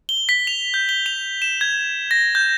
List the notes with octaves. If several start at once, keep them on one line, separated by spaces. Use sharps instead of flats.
G7
B6
F7
G6
G7
F7
E7
G#6
A#6
G6